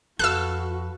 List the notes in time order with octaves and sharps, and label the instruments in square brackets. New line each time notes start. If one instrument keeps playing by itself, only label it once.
[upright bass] F2 [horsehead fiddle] F#4 [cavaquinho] A4 B4 F5 [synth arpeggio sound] E6 F#6